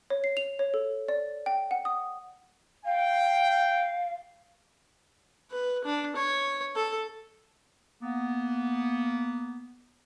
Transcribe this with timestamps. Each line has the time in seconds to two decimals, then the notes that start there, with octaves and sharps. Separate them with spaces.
0.10 C#5
0.24 C7
0.37 F7
0.59 C#5
0.74 A4
1.08 D5
1.46 G5
1.71 F#5
1.85 D#6
2.85 F5 G5
5.51 B4
5.85 D4
6.16 C#5
6.76 A4
8.02 A#3 B3